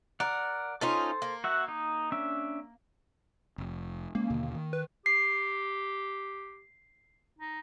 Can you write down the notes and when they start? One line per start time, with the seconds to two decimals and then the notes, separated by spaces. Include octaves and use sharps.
0.20 A#4 D5 F#5
0.81 C#4 D#4 F4 A4 C5
1.22 A#3
1.44 F#4 E5 F#5
1.68 D#4
2.12 C#4 D4 E5
3.58 F1
4.15 G#3 A#3 C#4
4.30 D#2 B2 D3
4.55 D#3
4.73 B4
5.06 G4 C7
7.39 D#4